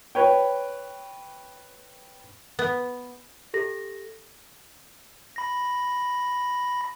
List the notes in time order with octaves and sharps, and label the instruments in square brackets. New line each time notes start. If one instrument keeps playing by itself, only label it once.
[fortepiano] B4 C#5 G5
[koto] B3
[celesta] G4 A4 A#6
[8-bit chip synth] B5 A#6